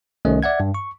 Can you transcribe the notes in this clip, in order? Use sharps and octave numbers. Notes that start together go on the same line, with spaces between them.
C2 D#3 A3 C#4 D#5
D5 E5 F#5 G#6
G2
C#6